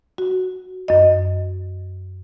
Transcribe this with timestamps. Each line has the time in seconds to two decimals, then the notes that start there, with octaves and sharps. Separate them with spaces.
0.18 F#4
0.88 F#2 D#5